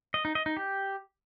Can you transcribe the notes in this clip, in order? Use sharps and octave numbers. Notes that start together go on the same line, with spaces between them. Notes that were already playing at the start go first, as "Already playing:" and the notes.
D#5
D#4
D#5
D#4
G4